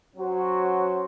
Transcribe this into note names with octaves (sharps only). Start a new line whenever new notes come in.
F#3 C#4 F#4 C5